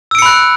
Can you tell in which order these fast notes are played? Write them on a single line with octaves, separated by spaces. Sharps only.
E6 D7 C#7 B5 F#6